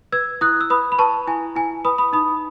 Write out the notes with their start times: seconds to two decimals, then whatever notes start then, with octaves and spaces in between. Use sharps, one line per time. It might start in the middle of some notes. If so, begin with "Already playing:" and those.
0.12 B4 E6 G#6
0.41 E4 D#6 F#6
0.61 E6
0.70 B4 B5 D#6
0.92 B5
0.98 B4 A5 C#6
1.27 E4 G#5
1.56 E4 G#5
1.85 B4 B5 D#6
1.98 B5 D#6
2.13 D#4 B5 D#6